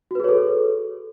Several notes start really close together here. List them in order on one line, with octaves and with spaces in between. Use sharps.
F#4 B4 G#4 C#5 A4